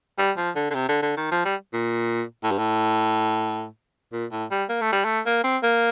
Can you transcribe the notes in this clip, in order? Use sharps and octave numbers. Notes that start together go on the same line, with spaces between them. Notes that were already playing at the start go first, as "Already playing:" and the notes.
G3
F3
D3
D3
C3
D3
D3
D#3
F3
G3
A#2
A2
G2
A2
A#2
A2
G3
A#3
A3
G3
A3
A#3
C4
A#3